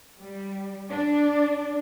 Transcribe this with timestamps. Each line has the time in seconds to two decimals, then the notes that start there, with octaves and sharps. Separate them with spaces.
0.20 G3
0.91 D4